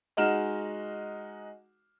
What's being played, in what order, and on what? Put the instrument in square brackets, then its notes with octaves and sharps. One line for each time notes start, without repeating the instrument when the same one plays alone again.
[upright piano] G#3 D#4 F#4 F6 E7